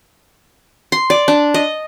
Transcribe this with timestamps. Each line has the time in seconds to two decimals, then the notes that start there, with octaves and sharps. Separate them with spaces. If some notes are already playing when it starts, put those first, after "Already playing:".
0.92 C6
1.10 D5
1.28 D4
1.54 D#5